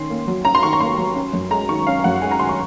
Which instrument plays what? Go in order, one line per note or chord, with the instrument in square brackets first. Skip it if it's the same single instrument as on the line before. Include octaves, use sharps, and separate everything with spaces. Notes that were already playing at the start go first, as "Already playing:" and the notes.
Already playing: [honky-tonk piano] D#3 C#4 C6
A#3
F#3
C#4 A#5
C6
D#3 C#6
A#5
A#3 C6
F#3
C#4
F#2
G#3 A#5
D#3 C#6
C#4 F5
F#2 F#5
G#3 G#5
A#5
D#3 C6
C#6